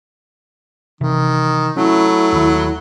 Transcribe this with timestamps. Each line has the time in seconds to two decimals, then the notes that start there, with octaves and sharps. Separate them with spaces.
1.01 C3 D#3 E3
1.77 F#3 A3 C#4 E4
2.32 D#2 D#3